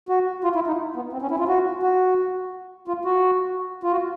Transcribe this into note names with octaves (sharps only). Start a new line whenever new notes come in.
F#4
F4
E4
D#4
B3
C4
C#4
E4
F4
F#4
F#4
F4
F#4
F4
F#4